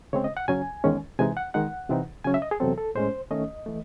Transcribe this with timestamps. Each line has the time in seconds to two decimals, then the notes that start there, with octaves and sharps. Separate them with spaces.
0.13 C#3 G#3 C4 C#5
0.24 D#5
0.37 F#5
0.48 F#2 C#3 F#3 C#4 G#5
0.84 E2 D#3 G#3 C#4
1.19 C3 E3 G#3 D#4 G#5
1.37 F#5
1.54 D#3 G#3 D#4 F#5
1.90 C3 E3 C4 D#4
2.24 C#3 F#3 C#4 G#5
2.34 E5
2.42 D#5
2.51 G#4
2.60 E2 C3 F#3 C4 A4
2.78 A4
2.95 A2 G#3 C#4 C5
3.31 D#3 A3 C#4 D#5
3.66 E3 A3